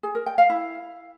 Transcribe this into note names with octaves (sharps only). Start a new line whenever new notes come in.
G#4
A#4
G5
F5
E4